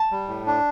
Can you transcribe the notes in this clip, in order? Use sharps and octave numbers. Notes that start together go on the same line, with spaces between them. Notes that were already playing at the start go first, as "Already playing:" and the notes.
Already playing: A5
G3
A2
D4